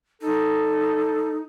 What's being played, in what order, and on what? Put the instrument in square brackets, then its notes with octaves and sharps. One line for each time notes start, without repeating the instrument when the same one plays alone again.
[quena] D#4 [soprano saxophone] A4